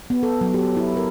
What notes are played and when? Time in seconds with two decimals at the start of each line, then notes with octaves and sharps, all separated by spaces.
0.10 B3
0.23 A4
0.41 F#3
0.54 G4
0.77 E4
0.97 A#4